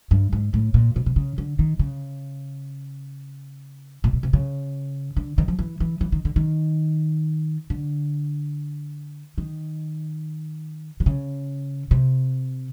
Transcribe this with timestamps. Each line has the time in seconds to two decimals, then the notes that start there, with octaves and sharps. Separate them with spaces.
0.11 G2
0.33 G#2
0.54 A2
0.74 A#2
0.96 B2
1.06 C3
1.16 C#3
1.38 D3
1.59 D#3
1.79 C#3
4.04 A#2
4.13 B2
4.23 C3
4.33 C#3
5.16 D3
5.38 D#3
5.48 F3
5.59 E3
5.80 E3
6.01 E3
6.12 D#3
6.25 D3
6.36 D#3
7.70 D3
9.38 D#3
11.00 D3
11.06 C#3
11.91 C3